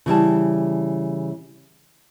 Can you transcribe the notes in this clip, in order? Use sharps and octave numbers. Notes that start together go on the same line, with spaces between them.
C#3 E3 G3 A5